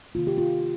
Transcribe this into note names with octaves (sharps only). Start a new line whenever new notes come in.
C3 D#3 A#3 F4
G4
F4